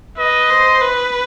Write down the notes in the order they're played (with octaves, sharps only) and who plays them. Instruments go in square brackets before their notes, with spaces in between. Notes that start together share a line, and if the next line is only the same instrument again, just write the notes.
[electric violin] B4 [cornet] D#5
[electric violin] C5
B4